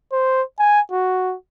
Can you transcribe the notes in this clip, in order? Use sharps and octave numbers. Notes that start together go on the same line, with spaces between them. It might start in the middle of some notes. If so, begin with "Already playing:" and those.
C5
G#5
F#4